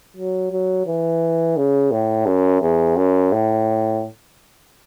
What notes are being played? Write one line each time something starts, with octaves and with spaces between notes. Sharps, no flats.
F#3
F#3
E3
C#3
A2
F#2
E2
F#2
A2